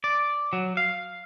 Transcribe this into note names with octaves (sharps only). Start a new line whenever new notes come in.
D5
F#3
F5